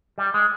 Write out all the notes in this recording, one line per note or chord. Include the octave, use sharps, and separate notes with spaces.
G3
G#3